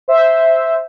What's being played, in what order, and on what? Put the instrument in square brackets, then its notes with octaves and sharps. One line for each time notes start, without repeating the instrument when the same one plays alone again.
[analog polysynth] C5 E5